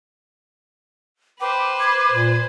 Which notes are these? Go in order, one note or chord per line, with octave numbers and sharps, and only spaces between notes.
B4 C5 G5 B5 D6
G#6
A#2